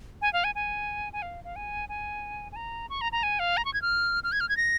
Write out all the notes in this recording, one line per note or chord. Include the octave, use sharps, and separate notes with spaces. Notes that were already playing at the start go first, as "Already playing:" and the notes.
G#5
F5
G#5
G#5
G#5
F5
F5
G#5
G#5
G#5
A#5
C#6
A#5
A#5
G#5
F5
A#5
C#6
G#6
F6
F6
G#6
F6
G#6
A#6